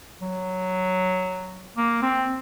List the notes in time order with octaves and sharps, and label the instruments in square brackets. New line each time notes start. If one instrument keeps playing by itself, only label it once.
[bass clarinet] F#3
A#3
C4